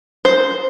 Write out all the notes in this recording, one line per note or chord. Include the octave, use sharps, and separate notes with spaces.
C5